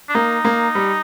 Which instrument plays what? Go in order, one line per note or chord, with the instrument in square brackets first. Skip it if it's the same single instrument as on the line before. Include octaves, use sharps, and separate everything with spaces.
[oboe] D4
[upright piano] A#3 [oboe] D#4
[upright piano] A#3
G3